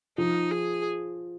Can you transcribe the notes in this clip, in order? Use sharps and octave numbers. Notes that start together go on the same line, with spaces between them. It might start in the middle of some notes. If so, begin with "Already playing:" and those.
F3 D#4
G#4